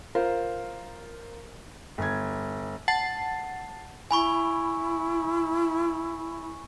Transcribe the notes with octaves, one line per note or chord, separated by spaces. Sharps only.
F4 A#4 C5
G1 G#6
F#5 A5 A6 C7
E4 G#5 B5 C#6